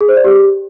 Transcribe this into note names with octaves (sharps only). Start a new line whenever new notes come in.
G#4
C5
D5
G4